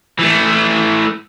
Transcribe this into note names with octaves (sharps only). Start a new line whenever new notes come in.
E3 A3